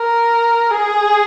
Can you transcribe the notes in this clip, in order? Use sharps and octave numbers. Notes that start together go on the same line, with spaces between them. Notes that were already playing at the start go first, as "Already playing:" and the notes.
Already playing: A#4
G#4